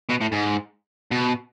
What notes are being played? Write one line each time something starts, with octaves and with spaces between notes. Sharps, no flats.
B2
A2
G#2
B2